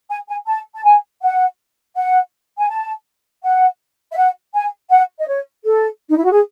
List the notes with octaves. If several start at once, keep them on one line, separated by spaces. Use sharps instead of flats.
G#5
G#5
A5
A5
G#5
F#5
F#5
G#5
A5
F#5
E5
F#5
G#5
F#5
D#5
C#5
A4
D#4
E4
F#4
G#4